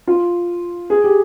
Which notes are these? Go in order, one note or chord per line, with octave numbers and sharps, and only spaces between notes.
F4
G#4
G4